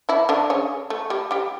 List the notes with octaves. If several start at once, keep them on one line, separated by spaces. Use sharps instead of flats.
E3 E4
D3 D4
C#3 C#4
A3
G3 G4
G3 G4